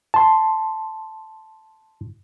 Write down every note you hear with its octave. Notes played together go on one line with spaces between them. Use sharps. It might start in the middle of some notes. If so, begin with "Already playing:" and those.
A5 C6